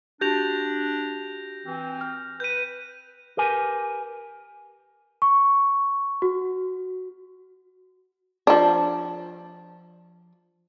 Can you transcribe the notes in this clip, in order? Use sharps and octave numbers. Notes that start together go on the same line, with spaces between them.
D4 F#4 G4 G6 A#6 F7
E3 C4
F6
B4 G6 D#7
G4 A#4 B4 G#5
C#6
F#4
F3 D4